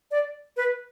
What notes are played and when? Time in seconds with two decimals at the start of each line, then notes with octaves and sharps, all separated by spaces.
0.11 D5
0.57 B4